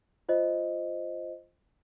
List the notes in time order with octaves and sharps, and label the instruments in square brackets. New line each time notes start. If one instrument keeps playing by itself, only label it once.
[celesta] F4 C5 D#5